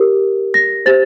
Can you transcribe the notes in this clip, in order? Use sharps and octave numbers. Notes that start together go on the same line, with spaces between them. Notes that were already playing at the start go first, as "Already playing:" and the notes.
Already playing: G4 A#4
A#6
G4 C5 A6